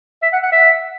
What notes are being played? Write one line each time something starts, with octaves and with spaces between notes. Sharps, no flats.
E5
F#5
F#5
E5